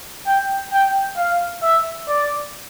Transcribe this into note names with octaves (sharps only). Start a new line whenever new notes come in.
G5
G5
F5
E5
D5